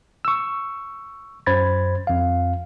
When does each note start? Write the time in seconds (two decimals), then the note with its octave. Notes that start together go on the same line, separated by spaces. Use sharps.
0.25 C#6 E6
1.46 F#2 C5 B5 G#6 A6
2.07 F2 F5